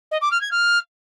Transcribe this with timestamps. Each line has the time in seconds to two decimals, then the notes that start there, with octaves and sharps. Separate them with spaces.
0.11 D#5
0.21 D6
0.31 F6
0.41 G#6
0.51 F6